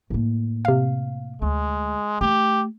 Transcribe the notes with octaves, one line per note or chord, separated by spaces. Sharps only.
A2 A#3
C3 F5
D2 G#3
A3 G4